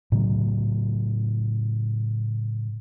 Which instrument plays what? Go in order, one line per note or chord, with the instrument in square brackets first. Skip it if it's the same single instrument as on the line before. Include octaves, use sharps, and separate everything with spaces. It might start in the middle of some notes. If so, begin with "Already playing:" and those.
[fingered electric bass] A2 C#3 F#3